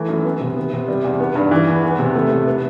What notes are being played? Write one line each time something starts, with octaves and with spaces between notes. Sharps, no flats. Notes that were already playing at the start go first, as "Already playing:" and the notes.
Already playing: E3 A3
F#2
B3
C3
B3
C3
G3
E2
B3
G2
E3
E2
B3
C3
A3
A2
B3